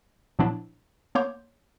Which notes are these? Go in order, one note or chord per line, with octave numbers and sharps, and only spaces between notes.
A#2 F3 F#3 B3 D4 E4
A#3 B3 C#5 C6 D6 G6